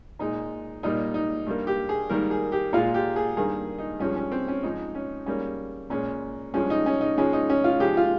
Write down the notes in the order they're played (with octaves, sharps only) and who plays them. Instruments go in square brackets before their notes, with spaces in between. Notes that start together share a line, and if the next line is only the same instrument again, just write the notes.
[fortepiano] A#2 G#3 D#4
A#2 G3 A#3 D#4
D#4
G2 G3 A#3
G4
G#4
G#2 D#3 G3 A#3 A#4
G#4
G4
A#2 G#3 F4
G4
G#4
G2 D#3 A#3 G#4
D#4
G2 F3 G#3 C#4
C#4
C4
C#4
G#2 F3 G#3 D#4
C#4
G#2 G3 A#3 C#4
A#2 G#3 C#4
G2 F3 G#3 C#4
D#4
C#4
D#4
G#2 F3 G#3 C#4
D#4
C#4
F4
G#2 F3 G#3 G4
F4